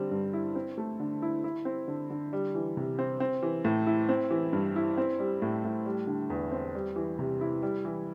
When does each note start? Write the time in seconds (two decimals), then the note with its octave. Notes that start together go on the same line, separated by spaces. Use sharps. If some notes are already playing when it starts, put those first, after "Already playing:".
Already playing: D3 G3 C4
0.11 G2
0.33 E4
0.55 C4
0.78 A3
1.00 D3
1.22 E4
1.44 E4
1.65 C4
1.88 D3
2.10 D3
2.33 G3
2.55 E3
2.77 C3
2.99 C4
3.20 C4
3.43 E3
3.65 A2
3.87 E4
4.09 C4
4.30 E3
4.53 G2
4.76 E4
4.97 C4
5.19 G3
5.42 A2
5.64 A2
5.86 G3
6.07 D3
6.30 E2
6.52 C4
6.75 G3
6.96 E3
7.19 C3
7.41 E4
7.62 G3
7.85 E3